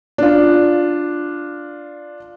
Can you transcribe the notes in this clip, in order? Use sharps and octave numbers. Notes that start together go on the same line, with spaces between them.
D4 F4